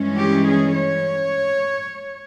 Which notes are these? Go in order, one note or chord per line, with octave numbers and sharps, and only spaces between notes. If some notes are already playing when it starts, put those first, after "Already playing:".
Already playing: G2 E3 G#3 C#4
G4
G#4
C#5